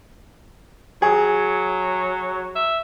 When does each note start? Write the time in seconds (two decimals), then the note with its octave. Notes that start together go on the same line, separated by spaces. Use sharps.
1.02 F#3 G#4
2.55 E5